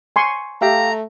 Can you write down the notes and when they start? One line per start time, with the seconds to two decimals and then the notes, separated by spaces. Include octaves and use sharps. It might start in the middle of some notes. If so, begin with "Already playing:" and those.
0.16 G#5 C6 C#6
0.62 A3 G4 E5 F5 A#5